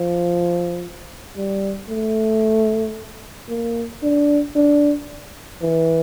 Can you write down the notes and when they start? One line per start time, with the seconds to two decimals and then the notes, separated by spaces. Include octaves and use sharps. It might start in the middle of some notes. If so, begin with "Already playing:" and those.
Already playing: F3
1.37 G3
1.89 A3
3.49 A#3
4.03 D4
4.56 D4
5.62 E3